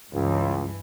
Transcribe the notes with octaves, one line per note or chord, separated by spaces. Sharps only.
C#2 G2 E3